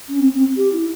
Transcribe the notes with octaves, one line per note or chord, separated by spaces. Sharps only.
C#4
C4
C4
G4
E4